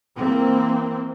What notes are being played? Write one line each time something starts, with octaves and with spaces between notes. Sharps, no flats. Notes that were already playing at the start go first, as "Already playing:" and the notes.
E3 A#3 C4